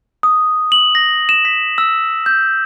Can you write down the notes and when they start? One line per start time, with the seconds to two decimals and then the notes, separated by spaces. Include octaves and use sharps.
0.23 D#6
0.72 F#7
0.95 A#6
1.29 E7
1.45 B6
1.78 E6
2.26 G6